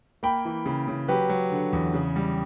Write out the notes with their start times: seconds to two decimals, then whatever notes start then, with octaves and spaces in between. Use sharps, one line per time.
0.23 A#3 G5 B5
0.45 E3
0.66 C#3
0.88 C#3
1.08 F#3 G4 B4
1.29 F#3
1.52 D3
1.73 E2
1.94 C#3
2.16 G3